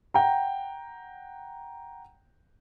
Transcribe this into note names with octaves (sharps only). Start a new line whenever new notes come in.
F#5 G5 A#5